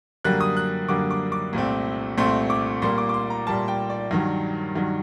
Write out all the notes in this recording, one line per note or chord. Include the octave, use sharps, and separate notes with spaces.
F#2 D3 G3 A#3 F#6
D#6
F#6
F#2 D3 G3 A#3 D6
D6
D6
C2 A#2 A3 C4
C2 A#2 A3 C4 C6
D6
A#2 G3 A#3 C6
D6
D6
C6
A#5
A#2 G3 A#3 A5
G5
D5
G2 D#3 F#3
G2 D#3 F#3